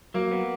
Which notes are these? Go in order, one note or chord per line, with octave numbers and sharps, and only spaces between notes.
F#3 A#3
B3